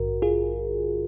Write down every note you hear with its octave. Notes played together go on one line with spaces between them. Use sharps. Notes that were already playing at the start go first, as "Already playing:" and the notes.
Already playing: A#1 G#2 D#3 F#4 A#4
F4 G#4